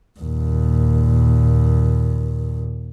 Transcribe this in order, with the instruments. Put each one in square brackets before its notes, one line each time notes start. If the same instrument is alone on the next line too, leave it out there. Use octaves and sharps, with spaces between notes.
[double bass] D#2 A#2